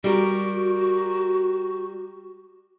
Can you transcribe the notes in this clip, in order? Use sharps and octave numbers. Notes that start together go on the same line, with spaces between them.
G3 F#4 A#4